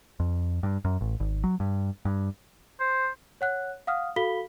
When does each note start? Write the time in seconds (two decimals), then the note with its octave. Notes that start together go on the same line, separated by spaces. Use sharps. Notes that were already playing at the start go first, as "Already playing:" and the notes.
0.20 F2
0.63 G2
0.85 F#2
1.01 A1
1.20 G#1
1.44 F#3
1.60 G2
2.05 G2
2.80 C5
3.41 C#5 F#5 F#6
3.87 F5 F#5 D#6 F6
4.16 F#4 A4 F5 B5 B6 G7